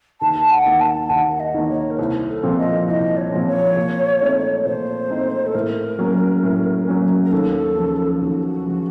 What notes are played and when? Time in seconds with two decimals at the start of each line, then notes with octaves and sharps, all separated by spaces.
0.21 D#2 A5
0.51 F#5
0.66 D#3 A#3
0.80 A5
1.10 D#2 F#5
1.40 D#5
1.54 D#3 A#3
1.64 D#5
1.69 C#5
1.90 A#4
1.99 C2 C5
2.29 A4
2.43 A#2 F3 C4
2.58 D#5
2.87 C2 D#5
3.17 C#5
3.32 A#2 F3 C4
3.47 C#5
3.77 A#2
4.21 A3 C4 D#4
4.65 A#2 C5
5.10 A3 C4 D#4
5.46 A4
5.55 A2 A#4
5.99 F#3 A#3 C#4
6.43 A2
6.88 F#3 A#3 C#4
7.25 A#4
7.32 D#2 A4
7.76 C#3 F3
8.21 D#2 F#4
8.65 C#3 F3